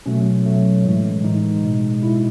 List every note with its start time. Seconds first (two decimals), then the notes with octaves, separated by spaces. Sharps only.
0.06 B2 F#3 A3 C#4
0.46 B2 F#3 A3
0.85 A2 E3 G#3
1.24 A2 E3 G#3 D#4
1.64 B2 G#3
2.03 B2 G#3 E4